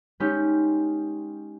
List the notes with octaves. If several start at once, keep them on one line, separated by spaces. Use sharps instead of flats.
G#3 C#4 D#4 G4